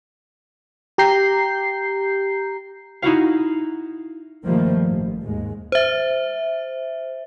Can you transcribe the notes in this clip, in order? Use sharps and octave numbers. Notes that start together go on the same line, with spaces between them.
G4 A#5 G6 C7
D#4 E4 F#4 F5
G2 D#3 F3 G3 A3 A#3
A1
D#2 G#2 G#3
C5 E5